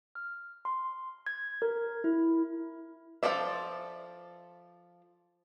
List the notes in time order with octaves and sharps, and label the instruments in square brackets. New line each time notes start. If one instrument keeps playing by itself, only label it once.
[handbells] F6
C6
G#6
A#4
E4
[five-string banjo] F3 G#4 A4 D5 E5